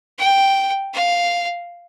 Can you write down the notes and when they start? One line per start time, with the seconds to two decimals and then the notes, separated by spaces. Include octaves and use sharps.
0.18 G5
0.94 F5